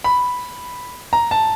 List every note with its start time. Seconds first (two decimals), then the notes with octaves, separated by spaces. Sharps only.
0.04 B5
1.13 A#5
1.31 A5